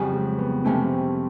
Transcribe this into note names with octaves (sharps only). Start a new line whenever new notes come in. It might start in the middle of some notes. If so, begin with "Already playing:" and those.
Already playing: F2 C#3 F#3 G3
G#3
B3
C3 F3 A3 C4 C#4